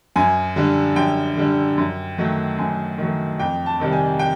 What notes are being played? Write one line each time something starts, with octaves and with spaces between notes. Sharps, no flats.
F#2 G#5
D3 G3
F#2 G5
D3 G3
F#2
D#3 F#3 A3
F#2 G#5
D#3 F#3 A3
F2 G5
A5
C3 D#3 G3
G#5
G5